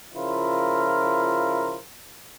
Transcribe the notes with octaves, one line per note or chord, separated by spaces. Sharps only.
C#3 F3 E4 F4 A#4